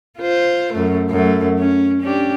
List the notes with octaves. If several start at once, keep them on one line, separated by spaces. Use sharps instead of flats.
F4 C5
F#2 A3
F#2 A3
C#4
C#4 D4 G4